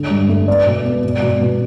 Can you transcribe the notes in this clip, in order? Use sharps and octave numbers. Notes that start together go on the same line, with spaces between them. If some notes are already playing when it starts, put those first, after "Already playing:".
Already playing: D3
G2
A3
B3 D5
B2
B3
B2
B2
B2